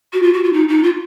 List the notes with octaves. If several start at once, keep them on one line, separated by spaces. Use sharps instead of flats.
F#4
F4
F#4
F4
D#4
D#4
F4